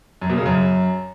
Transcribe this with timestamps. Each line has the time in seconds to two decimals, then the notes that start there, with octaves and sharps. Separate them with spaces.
0.22 F#2
0.30 B2
0.38 C#3
0.46 F#2